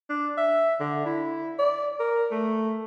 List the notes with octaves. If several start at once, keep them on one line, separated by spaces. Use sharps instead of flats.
D4
E5
D3
E4
D5
A#4
A3